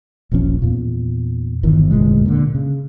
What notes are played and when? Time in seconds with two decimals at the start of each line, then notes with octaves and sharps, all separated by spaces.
0.31 D#1 A#1 F3 C#4
0.62 E2 A#2
1.63 G1 D#3 E3
1.91 F1 D2 A#2 G#3
2.26 A#2 D3
2.55 C#3